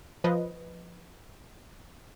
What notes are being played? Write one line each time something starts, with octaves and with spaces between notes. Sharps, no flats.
F3 B4 D#5